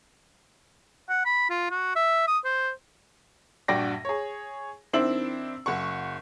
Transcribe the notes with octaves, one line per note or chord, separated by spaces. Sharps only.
F#5
B5
F4
F#4
E5
D#6
C5
A#1 G2 F#4 D5 G5 A#6
G#4 C#5
D#3 C4 D4 E4 E6 F#7
F#1 F#5 C#6